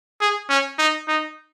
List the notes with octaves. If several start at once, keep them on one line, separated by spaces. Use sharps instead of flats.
G#4
C#4
D#4
D#4